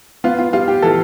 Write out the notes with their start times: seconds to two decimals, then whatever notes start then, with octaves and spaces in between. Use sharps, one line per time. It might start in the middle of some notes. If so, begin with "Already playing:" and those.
0.24 B3 F4
0.39 F4
0.53 G3 F4
0.68 G4
0.82 E3 A4